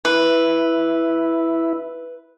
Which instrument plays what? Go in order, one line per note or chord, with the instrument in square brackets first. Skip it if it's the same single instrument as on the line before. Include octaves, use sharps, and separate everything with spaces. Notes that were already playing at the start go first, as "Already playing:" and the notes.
[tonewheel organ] E4 [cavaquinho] B4